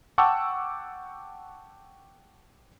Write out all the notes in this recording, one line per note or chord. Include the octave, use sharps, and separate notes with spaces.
F#5 G5 A5 C#6 D6 E6